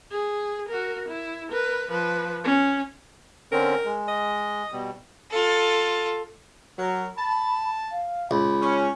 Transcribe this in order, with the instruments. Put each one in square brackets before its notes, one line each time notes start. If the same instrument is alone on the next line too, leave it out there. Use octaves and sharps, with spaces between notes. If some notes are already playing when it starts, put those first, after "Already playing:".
[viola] G#4
F#4 A#4
E4
A#4 B4
F3 B4
C#4
[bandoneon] D3 C4 C#4 [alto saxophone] A#4
[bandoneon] G#3
[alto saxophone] D#5
[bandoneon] B2 G3
[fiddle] F4 A4
[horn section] F#3 A#4
[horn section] A5 [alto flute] B5
[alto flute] F5
[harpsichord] C#2 [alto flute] B5
[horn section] C#4